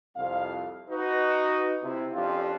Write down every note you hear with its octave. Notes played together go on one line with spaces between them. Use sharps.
C2 F2 F5
D#4 F#4 B4
C3 E4
F2 C#4 D4 F4 G4 F5